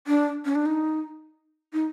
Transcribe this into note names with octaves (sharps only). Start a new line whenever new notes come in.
D4
C#4
D4
D#4
D#4